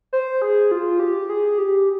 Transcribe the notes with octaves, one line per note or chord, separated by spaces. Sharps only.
C5
G#4
F4
G4
G#4
G4